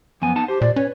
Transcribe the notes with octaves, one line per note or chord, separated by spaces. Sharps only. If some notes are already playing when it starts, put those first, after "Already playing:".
F#2 F3 B3 G#5
D#4 F#5 A5
G4 C5
A#2 D5
C#4 B4 C#5